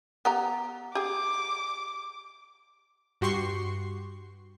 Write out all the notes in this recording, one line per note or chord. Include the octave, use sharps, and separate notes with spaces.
B3 G4 F#5 A#5
G4 G#4 D6
G2 F#4 G4 C6 C#6 C7